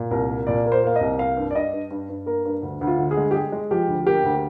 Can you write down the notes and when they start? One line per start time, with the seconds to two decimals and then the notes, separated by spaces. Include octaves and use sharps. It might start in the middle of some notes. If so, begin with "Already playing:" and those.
Already playing: A#2
0.11 C2 A#4
0.30 A#3
0.47 A#2 D5
0.66 A#3
0.72 C5
0.84 A#3 F5
0.96 C2 D#5
1.18 A#3 F5
1.37 G2
1.51 D5
1.55 G2 D#5
1.73 G2
1.91 G2
2.09 G2
2.26 A#3 A#4
2.45 G2
2.62 D2
2.81 D2
2.87 F4
2.98 D3
3.11 G#4
3.17 G#3
3.31 G4
3.34 G#3 G#4
3.52 G#3
3.71 F3 G4
3.88 D2
4.07 A#3 G4
4.24 D2